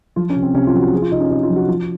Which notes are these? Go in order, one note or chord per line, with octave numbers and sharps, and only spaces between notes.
F3 F4
C#4
C3
C4
C3 C#4
F4
F3
F#4
F3 G#4
F4
C3 D#4
C#4
C3 D#4
F4
F3
F#4
F3 F4